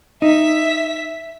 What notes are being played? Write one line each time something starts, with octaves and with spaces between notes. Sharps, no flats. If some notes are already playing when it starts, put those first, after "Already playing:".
D#4 E5 B6